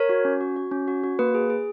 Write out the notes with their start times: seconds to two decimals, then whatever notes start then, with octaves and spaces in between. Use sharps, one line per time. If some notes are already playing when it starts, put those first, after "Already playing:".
Already playing: A#4 C#5
0.09 F#4
0.25 C#4
0.41 F#4
0.56 F#4
0.71 C#4
0.88 F#4
1.04 F#4
1.19 A#3 B4
1.35 G#4
1.50 G#4